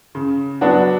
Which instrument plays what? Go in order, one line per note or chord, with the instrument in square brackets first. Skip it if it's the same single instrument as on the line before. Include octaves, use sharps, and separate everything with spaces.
[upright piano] C#3
F#3 B3 D4 F#4